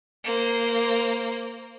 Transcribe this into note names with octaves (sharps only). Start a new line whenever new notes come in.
A#3 C5